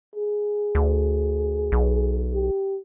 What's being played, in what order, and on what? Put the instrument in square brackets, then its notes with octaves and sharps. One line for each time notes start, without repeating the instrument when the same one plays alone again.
[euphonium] G#4
[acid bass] D2
B1
[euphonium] G4